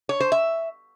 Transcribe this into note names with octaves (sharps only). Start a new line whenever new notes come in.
C#5
C5
E5